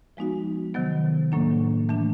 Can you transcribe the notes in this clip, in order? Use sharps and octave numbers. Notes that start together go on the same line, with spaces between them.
F3 G#3 B3 D#4 F#4
C3 D#3 F#3 B3
A2 F#3 A#3 D4
E3 A3 D4